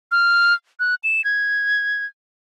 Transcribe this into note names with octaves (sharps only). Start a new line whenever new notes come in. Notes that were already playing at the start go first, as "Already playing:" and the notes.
F6
F#6
E7
G#6